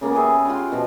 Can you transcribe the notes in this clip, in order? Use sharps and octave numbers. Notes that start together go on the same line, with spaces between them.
C#3 A#3 B3 F#5
G4 G#4 B4 E5
F4 G4 F#5 C6
B2 F3